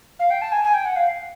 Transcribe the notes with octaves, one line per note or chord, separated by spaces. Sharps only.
F5
G5
A5
G#5
G#5
G5
F#5
F5